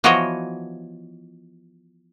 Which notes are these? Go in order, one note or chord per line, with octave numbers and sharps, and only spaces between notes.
E3 F3 B3 F#4 C#5 D#5